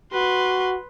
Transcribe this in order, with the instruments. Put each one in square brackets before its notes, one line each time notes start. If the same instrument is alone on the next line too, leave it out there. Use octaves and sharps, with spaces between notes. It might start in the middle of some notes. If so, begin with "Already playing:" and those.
[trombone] F#4 [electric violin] B4 C6